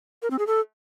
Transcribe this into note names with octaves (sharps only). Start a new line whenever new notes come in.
A#4
C4
G#4
A4